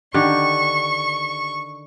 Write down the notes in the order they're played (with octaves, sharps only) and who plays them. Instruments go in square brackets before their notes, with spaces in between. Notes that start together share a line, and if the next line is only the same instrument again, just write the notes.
[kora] D3 D#3 G4 [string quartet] C#6